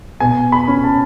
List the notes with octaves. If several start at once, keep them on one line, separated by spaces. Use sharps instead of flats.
B2 G#5
B5
C#4
A5